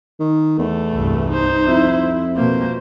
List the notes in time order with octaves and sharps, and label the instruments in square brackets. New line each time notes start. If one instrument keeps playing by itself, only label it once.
[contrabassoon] D#3
[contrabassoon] E2 [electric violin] A3
[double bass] C2 G2
[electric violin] D#4 C5
[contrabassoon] F2 [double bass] E4
[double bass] B2 A#3 [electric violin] C5